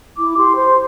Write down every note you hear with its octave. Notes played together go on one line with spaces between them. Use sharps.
E4 D6
G4 C6
C5 C6